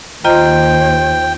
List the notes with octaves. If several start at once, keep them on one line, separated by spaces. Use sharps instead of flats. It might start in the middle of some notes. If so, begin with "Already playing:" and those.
D#2 F4 C5 D#5 G5 A#5